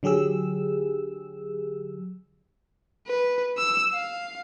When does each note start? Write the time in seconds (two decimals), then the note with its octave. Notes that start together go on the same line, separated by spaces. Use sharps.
0.03 D3 F#3 G4 G#4 E6
3.07 B4
3.58 E6
3.94 F5